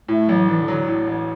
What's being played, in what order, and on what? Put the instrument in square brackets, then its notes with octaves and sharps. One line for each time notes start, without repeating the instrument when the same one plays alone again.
[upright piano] A2 [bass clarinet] A3
[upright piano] A1 [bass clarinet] F#3
[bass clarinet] E3 [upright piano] D4
[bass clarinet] D3
[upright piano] F#3
A2
A1